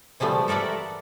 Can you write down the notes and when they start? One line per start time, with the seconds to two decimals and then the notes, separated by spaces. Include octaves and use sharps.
0.20 E3 F3 G3 A3 B3
0.48 A4 A#4 D5 E5 F#5